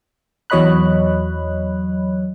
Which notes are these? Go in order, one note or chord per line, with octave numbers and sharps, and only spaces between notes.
E2 F#3 C#5 D#5 B5 F#6